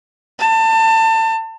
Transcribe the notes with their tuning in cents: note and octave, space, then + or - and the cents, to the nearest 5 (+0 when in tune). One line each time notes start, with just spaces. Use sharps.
A5 +30